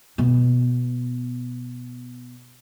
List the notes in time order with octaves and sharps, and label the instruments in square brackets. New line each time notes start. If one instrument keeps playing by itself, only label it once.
[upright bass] B2 B3